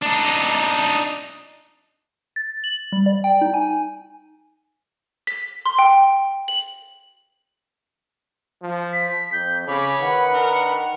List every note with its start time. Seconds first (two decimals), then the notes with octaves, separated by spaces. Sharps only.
0.02 D4 D#4
2.36 A6
2.64 F#7
2.92 G3
3.06 D5
3.24 G5
3.41 D#4
3.54 G#5
5.27 B6
5.66 C6
5.79 G5
6.48 F#7
8.62 F3
8.93 B6
9.32 F2 G6
9.67 C#3 C#5 B5 D6
10.01 D#3 B4 F#5
10.32 D4 A#4